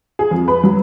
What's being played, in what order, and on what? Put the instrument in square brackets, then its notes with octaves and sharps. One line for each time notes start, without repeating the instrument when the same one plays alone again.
[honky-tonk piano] G#4
F2
B4
F#3